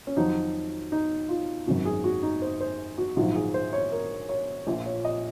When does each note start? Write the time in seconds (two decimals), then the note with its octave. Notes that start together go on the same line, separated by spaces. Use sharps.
0.07 C#4
0.17 F2 D#3 F#3 D#4
0.92 D#4
1.29 F4
1.66 G#1 F#2 D#3 F#4
1.85 G#4
2.04 F#4
2.23 D#4
2.42 C5
2.61 C5
2.98 F#4
3.16 A#1 G#2 D#3 F#3 F4
3.35 G#4
3.54 C5
3.73 C#5
3.92 A#4
4.29 C#5
4.67 A#1 A#2 F3
4.86 C#5
5.05 D#5